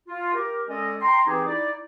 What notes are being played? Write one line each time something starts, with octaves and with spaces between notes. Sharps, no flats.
F4
G4 A#4
G#3 C#4 A4 D5 D#5
G5 A#5 C6
E3 C4 D#4 G4 G#4
D#4 E4 D5